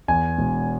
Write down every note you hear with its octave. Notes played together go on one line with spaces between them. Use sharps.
E2 G#5
E1